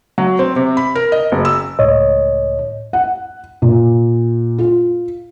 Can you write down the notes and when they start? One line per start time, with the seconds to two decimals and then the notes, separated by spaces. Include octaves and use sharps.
0.18 F#3
0.39 C4
0.56 C3
0.77 B5
0.95 A#4
1.12 D#5
1.32 F#1
1.45 E6
1.79 C#2 A2 C#5 D#5
2.93 F#5
3.62 A#2
4.58 F4